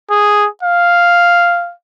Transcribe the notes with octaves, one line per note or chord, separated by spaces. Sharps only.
G#4
F5